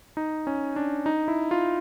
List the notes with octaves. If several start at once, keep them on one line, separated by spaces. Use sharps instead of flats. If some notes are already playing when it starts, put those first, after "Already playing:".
D#4
C#4
D4
D#4
E4
F4